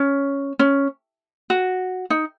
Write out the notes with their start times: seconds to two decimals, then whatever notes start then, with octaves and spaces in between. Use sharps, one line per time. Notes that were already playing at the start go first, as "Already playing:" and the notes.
Already playing: C#4
0.59 C#4
1.50 F#4
2.10 D#4